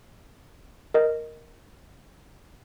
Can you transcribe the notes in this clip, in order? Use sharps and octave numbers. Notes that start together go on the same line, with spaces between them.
A#4 D#5